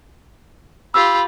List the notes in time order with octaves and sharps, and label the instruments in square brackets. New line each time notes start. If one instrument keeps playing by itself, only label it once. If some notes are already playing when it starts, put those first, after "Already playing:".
[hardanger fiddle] F4 G4 [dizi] B5 [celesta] E6